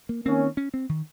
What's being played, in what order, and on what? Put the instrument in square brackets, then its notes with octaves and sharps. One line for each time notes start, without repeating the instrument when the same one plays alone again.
[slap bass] A#3
[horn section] D#3 A#3 C#4 [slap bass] C4
[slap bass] C#4
C4
D#3